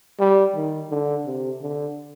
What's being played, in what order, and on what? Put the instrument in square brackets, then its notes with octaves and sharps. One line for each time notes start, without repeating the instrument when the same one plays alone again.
[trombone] G3
D#3
D3
C3
D3